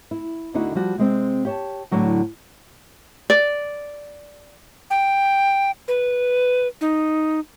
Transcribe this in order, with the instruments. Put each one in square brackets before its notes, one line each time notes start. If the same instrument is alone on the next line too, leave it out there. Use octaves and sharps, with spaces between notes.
[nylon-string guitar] E4
D2 D3 D#4 E4 F#4 F#5
F3 G3 F#4
C3 G#3 C4
G4 C#5 A5
A2 D3 F#3 F#4
[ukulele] D5
[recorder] G5
B4
D#4